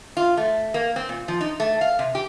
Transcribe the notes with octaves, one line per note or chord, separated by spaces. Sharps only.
F4
A3
A#3
C4
A#2
F3
D#4
A3
F5
C3
G4